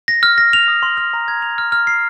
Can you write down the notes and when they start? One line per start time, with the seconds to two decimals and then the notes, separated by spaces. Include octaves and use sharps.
0.08 A#6
0.23 F6
0.38 A#6
0.53 F7
0.68 D#6
0.83 C6
0.97 F6
1.13 A#5
1.28 G#6
1.42 F7
1.58 F6
1.72 F6
1.87 C7